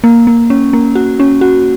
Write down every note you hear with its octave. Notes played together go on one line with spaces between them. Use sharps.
A#3
A#3
C#4
A#3
F#4
C#4
F#4